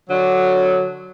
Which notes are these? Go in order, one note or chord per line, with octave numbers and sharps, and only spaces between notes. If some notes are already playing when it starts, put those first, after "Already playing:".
D3 F#3